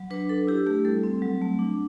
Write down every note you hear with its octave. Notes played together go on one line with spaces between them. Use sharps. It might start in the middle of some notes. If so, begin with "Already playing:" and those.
Already playing: F#3
D4 B4
D4 A4
E4 G4
A3 G4
G3 A4
C4
F#3
A3
D4